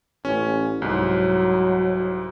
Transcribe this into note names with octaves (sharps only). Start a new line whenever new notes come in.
A1 C#4
C2 G#2 F#3